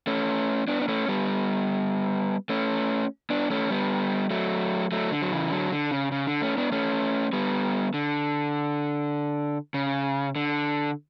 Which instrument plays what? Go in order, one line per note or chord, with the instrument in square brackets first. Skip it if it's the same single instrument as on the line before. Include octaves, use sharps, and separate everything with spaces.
[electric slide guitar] A3 C#4
B3 D4
D4
A3 C#4
G3 B3
A3 C#4
B3 D4
A3 C#4
G3 B3
F#3 A3
F#3 A3
D3
F#3
C#3 E3
D3 F#3
D3
C#3
C#3
D3
A3 C#4
B3 D4
A3 C#4
G3 B3
D3
C#3
D3